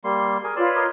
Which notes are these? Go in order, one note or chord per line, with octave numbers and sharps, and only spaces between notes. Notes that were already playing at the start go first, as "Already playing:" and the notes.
G3 A#3 C6
G#4 A#4 G#5
F4 B4 C#5 D5 C6 E6
A#4 D#5